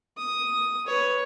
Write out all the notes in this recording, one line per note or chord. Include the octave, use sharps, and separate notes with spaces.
D#6
B4 C#5